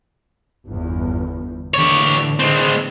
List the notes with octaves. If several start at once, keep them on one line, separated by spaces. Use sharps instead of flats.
G1 E2
A2 D3 E3 G4 C#5
G#3 C4